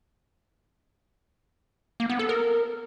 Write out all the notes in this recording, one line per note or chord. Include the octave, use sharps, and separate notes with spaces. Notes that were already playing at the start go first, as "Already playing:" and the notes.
A#3
B3
A4
A#4